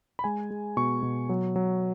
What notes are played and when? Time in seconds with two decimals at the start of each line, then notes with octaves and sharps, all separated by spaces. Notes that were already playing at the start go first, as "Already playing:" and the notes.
0.19 B5
0.24 G#3 G#5
0.50 G#3
0.77 B2 C#6
1.03 B2
1.29 F#3
1.56 F#3